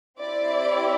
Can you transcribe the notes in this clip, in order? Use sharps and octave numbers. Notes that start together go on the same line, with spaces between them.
C4 E4 G4 D5